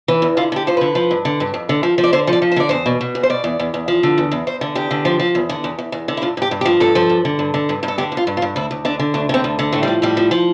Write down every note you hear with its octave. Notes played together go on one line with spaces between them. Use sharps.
E3
E2
D3 F4
D3 G4
F3 C5
D3 B4
F3
G2
D3
G2
F2
D3
F3
F3
D5
D3 C5
F3
D5
F3
C5
D3 D5
E2 C5
B2
B2
E2
C5
B2 D5
E2
E2
E2
F3
D3
E2
E2
E2 C5
D3
E2 G4
D3
F3
F3
E2
D3
E2
E2
E2
D3
E4
G2 F4
G2 G4
G2
G4
F3
G2 A4
F3
G2
D3
G2
D3
G2
G2
A4
D3 G4
G2
F4
G2
F4
G2
D2 E4
D2
D3 D4
D3
D2 D4
D3 C4
D2
D3
A2 A3
F3 G3
A2 G3
F3
F3